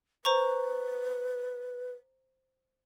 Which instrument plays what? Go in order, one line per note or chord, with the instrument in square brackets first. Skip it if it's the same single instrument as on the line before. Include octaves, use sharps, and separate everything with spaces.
[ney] B4 [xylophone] C5 A#5 C#6